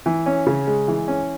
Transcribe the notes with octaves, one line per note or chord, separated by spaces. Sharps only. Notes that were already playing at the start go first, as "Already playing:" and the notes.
E3
C#4
C#3
G#3
E3
C#4